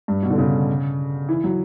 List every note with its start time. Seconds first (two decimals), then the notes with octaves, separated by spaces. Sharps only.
0.08 G2
0.23 B2
0.30 D3
0.38 C#3
1.28 E3
1.44 F#3